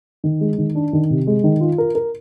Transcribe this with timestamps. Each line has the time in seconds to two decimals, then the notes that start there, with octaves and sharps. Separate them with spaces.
0.24 D#3
0.41 G#3
0.58 D#3
0.75 D4
0.93 D#3
1.10 C3
1.27 G#3
1.44 D#3
1.61 F4
1.78 A#4
1.95 A#4